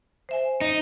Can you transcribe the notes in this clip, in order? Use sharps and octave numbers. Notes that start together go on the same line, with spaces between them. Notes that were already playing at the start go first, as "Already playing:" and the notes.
C5 E5 G#5
D#4